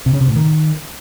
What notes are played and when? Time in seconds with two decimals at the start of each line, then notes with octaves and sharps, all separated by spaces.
0.06 C3
0.14 C#3
0.21 C3
0.28 A2
0.36 D#3